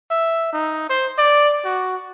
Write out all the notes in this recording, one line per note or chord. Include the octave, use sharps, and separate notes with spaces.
E5
D#4
C5
D5
F#4